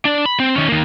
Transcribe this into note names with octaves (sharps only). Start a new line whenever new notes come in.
D4 D5
B5
C4
D#3 C#4
D#3 A#3